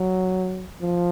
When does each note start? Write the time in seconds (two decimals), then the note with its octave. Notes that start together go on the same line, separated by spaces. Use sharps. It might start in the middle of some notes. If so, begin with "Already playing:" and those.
Already playing: F#3
0.81 F3